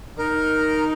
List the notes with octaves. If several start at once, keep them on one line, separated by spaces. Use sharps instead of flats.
D#4 A#4